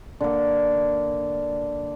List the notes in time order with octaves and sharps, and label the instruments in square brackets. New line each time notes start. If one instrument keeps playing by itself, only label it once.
[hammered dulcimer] D3 A#3